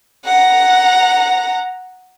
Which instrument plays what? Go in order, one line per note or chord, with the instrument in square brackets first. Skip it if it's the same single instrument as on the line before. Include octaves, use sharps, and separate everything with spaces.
[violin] F#5 A#5